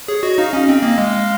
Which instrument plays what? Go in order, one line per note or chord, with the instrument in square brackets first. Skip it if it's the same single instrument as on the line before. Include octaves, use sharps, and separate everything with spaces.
[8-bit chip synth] G#4 [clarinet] C#5
[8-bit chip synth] F#4 [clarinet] D#5
[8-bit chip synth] D#4 [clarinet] F5
[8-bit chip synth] C#4 [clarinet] D#5
[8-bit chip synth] C4 [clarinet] F5
[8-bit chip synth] A#3 [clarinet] D#5
[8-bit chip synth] G#3 [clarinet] F5